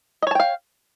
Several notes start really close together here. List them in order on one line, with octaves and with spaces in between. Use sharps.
D#5 C#5 A5 G5 F5